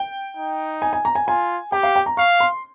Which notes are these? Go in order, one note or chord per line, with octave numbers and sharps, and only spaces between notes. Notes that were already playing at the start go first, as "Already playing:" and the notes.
Already playing: G5
D#4
G#5
G#5
A#5
G#5
F4 G#5
G4 G5
F5
G5
A#5
F5 C#6
C6